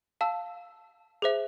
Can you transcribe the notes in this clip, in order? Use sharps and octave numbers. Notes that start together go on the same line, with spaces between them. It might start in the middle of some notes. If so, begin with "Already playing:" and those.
F5 A5 E6
G#4 C5 E5